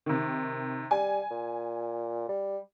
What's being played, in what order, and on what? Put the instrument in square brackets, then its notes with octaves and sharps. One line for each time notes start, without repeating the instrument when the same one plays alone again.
[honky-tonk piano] C3 D#3
[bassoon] G3 [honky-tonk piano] G#5
[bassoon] A#2
G3